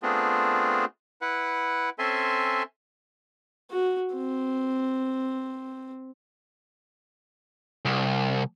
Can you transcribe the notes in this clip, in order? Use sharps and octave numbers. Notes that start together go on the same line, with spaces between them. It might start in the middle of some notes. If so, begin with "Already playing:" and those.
A3 B3 C4 D4 F4 G#4
E4 B4 F#5
C4 C#4 A4 E5 G#5 C6
F#4
C4
C2